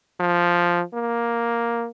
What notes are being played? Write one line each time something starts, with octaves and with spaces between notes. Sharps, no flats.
F3
A#3